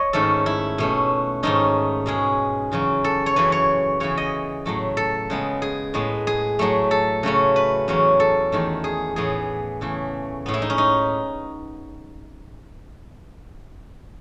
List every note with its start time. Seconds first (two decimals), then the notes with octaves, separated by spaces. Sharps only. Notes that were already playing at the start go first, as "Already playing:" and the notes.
Already playing: C#5 D#5
0.13 G#2 D#3 A3 C#4 A4
0.46 E4
0.78 B2 A3 C#4
1.43 G#2 D#3 A3 C#4 D#4
2.06 B2 G#3 C#4 G#4
2.72 E2 C#3 F#3 C#4
3.04 A4
3.26 C#5
3.36 F#2 C#3 E3 B4
3.52 C#5
4.00 C#3 E3 B3 C#5
4.18 D#5
4.66 A2 F#3 A3
4.97 A4
5.30 C#3 G#3 B3
5.62 G#4
5.94 A2 G#3 B3
6.27 G#4
6.59 A2 F#3 A3
6.91 A4
7.23 C#3 F#3 A3 C#4
7.56 B4
7.88 E2 C#3 F#3 C#4
8.20 A4
8.52 E2 D#3 A3
8.84 G#4
9.16 A2 E3 B3 G#4
9.81 C#3 E3 A3
10.46 A2 G#3 B3
10.54 E4
10.62 D#4
10.70 C#4
10.78 D#4